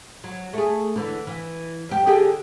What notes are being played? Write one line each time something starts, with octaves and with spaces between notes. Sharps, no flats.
F#3
A3 G#4
D3 E3
E3
F2 G4
D3 G4 G#4